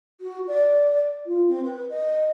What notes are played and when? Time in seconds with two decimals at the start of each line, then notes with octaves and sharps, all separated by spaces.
0.21 F#4
0.47 D5
1.26 F4
1.48 C4
1.64 B4
1.90 D#5